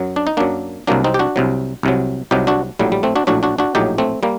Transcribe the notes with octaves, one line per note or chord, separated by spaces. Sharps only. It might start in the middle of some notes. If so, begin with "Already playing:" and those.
Already playing: F#2 F#3
D4
D#4
F#2 F#3 A#3 D4
C2 C3 F#3 A#3 D4
C4 D#4
G4
D4 F#4
C2 C3 F#3
C2 C3 F#3
C2 C3 F#3 D#4 G4
D4 F#4
A#1 A2 F#3 G3
G3
A3 C4
D4 F#4
A#1 A2 F#3 D4 F#4
D4 F#4
D4 F#4
A#1 A2 F#3 D#4 G4
A3 C4
G3 A#3